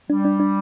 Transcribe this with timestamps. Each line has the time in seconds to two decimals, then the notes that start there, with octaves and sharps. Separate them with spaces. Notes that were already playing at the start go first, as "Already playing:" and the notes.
0.10 G3 D4
0.25 D4
0.40 D4